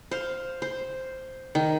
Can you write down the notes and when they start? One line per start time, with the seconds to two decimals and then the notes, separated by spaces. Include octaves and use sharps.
0.11 C5 F5
0.62 C5
1.55 D#3